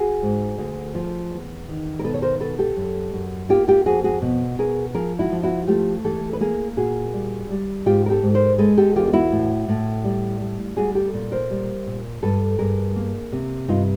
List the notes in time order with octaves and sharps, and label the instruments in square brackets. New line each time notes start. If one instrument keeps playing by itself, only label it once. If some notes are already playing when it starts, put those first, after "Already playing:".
Already playing: [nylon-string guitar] F#4 G#4
G#2
D2
F3
E2
D#3
A#4
B2 A4 B4
C#5
A#4 C5
B2 A4 B4
G4 A4
F#2
F#2
A#3 F4 G4
F4 G4
F2 F#4 G#4
F#4 G#4
B2
B2 G#4 A#4
F3 G#4 A#4
E4 F#4
F3
E4 F#4
A3 F4 G4
E3 G4 A4
B4
A#3 G#4 A#4
A#2 F#4 G#4
G3
G3
G#2 F4 G4
A#4
G4 A4
G#2
A#4 C5
G#3 A4 B4
G4 A4
E2 F4 G4
F4
E4 F#4
A2
A2
G3
G3
G3 F#4 G#4
G4 A4
A#2
A#4 C5
G3
A#2
G2 A4 B4
G2 G#4 A#4
A#3
C3
G2 D#4 F4